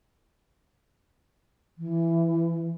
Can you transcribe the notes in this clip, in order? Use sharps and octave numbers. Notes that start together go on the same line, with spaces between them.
E3